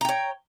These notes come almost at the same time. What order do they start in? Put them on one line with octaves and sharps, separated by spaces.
A#5 G5 C#5